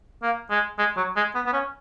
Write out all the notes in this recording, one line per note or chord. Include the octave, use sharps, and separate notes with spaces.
A#3
G#3
G#3
F#3
G#3
B3
B3
C#4